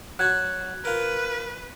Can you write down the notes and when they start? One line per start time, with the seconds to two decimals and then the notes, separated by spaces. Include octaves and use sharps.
0.19 F#3 F#4 F#6 G#6
0.85 F4 A#4 B4